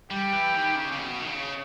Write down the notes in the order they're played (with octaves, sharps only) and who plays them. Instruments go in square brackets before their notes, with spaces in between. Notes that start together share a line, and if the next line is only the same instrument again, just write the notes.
[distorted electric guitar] G3 [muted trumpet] G4
[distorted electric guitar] E3
D#3
C#3
C#3
B2
D#3
C#3